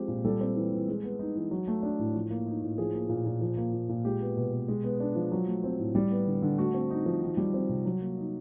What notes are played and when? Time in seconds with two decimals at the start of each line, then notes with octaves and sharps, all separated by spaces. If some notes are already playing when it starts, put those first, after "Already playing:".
Already playing: F3 G#3 C4 G4
0.08 A#2
0.25 G3 A4
0.41 C4
0.56 E3
0.72 E3
0.88 G#3
1.04 B3
1.19 D#4
1.36 E3
1.51 F#3
1.68 A3
1.83 D4
1.99 A2
2.15 F3
2.31 A#3
2.47 D#4
2.63 A2
2.78 F3 G#4
2.94 A#3
3.09 A#2
3.26 A#2
3.41 F3
3.57 A#3
3.73 A#2
3.89 A#2
4.05 G#3 G4
4.21 B3
4.37 B2
4.52 B2
4.68 G#3
4.84 B3
5.00 D4
5.16 F3
5.32 F#3
5.47 A3
5.64 C4
5.79 A2
5.95 G3
6.11 B3
6.26 D3
6.42 D3
6.58 A3 F#4
6.74 C4
6.90 D#4
7.06 F3
7.22 D#3
7.37 G3
7.54 C4
7.69 C3
7.85 F#3
8.01 A#3
8.17 D#4